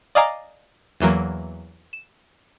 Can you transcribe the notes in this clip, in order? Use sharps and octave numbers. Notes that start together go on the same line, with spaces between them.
D5 D#5 F5 G#5 A#5 D6
E2 E3 F#3 A#3
E7